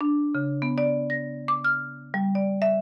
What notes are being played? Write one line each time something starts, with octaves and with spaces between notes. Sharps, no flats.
D4
C#3
B3
D5
A#6
D6
F6
G3
D5
E5